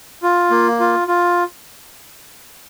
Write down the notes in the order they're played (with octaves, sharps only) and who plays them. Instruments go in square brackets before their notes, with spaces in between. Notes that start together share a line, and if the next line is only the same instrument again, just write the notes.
[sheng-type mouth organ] F4
A#3
F4
F4